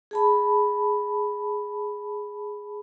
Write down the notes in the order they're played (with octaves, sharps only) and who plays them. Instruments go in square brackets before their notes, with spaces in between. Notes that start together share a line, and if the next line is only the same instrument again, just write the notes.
[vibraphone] G#4 A5 B5